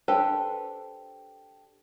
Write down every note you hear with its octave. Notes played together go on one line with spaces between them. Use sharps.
D4 G4 A4 B4 C5